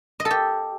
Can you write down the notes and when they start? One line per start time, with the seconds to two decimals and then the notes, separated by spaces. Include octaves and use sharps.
0.20 D#5
0.25 A4
0.31 G4